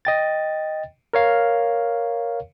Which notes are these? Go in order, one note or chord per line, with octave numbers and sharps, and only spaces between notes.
D#5 G5 A6
A#4 C#5 F5